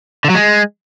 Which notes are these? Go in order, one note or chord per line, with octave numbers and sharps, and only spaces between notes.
D3
F#3
G#3